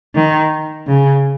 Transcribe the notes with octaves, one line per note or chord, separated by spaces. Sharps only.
D#3
C#3